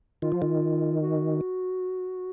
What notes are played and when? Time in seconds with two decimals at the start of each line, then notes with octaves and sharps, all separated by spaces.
0.22 D#3 F4
0.32 F3
0.42 D#3
1.02 F#4